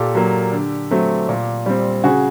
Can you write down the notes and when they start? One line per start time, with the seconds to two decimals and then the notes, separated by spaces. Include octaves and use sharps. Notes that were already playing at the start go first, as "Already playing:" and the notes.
Already playing: A#2 G4 A4
0.15 F#3 A#3
0.52 D3
0.91 F#3 A3 C4
1.29 A#2
1.66 G3 C4
2.04 C#3 F#4 G#4